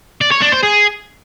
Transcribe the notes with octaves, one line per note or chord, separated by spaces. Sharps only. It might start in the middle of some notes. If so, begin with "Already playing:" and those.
D5
C#5
D4
C5
G#4